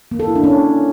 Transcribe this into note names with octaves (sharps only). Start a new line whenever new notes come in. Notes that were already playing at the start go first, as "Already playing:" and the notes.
A#3
A4
E4
D4
C#4